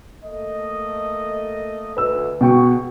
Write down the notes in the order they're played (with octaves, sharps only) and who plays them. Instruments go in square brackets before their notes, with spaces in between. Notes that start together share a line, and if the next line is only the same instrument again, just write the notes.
[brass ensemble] A3 A#3 D#5
[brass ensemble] D2 [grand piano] B4 E6
[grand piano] B2 G5 C#6 [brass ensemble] G#4 F#5